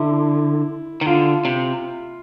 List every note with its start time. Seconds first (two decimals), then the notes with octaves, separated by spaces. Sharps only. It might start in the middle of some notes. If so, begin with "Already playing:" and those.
Already playing: D3 E4
1.01 D#3
1.06 D3 F4
1.45 C3